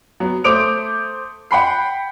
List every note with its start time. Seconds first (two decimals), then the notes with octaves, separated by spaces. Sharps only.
0.20 F#3 B3
0.44 A3 C5 D6 D#6 D7 F7
1.51 F#5 G5 B5 C7